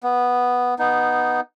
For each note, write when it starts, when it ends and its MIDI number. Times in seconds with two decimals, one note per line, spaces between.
0.03 0.74 59
0.79 1.41 59
0.79 1.41 63